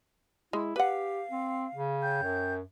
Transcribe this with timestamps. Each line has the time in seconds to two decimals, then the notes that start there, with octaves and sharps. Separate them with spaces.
0.53 G#3 E4
0.76 G4 B4 F5 F#5
1.31 C4
1.75 C#3
2.02 C#5 G5 G6
2.23 F#2